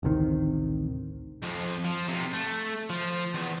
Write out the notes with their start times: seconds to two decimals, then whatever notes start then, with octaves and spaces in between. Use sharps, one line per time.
0.03 A1 D2 C3 D#3
1.43 F2 F3
1.84 F3
2.08 B1 C3
2.33 A3
2.90 F3
3.34 E2